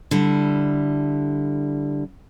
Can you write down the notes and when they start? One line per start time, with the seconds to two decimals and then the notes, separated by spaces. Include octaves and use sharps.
0.11 D3 G3 E4